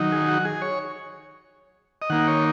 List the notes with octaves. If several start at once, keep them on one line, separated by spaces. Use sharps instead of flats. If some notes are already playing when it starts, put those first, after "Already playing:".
Already playing: D#3 F#3 D#4
G#4
F#4
G#4
C#5
D#5
D#3 A#3 D#4 F#5
C#5